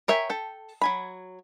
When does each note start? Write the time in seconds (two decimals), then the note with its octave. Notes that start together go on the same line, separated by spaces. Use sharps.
0.08 A#4 C#5 E5 G5 G#5
0.30 A4 G5
0.82 F#3 G#5 B5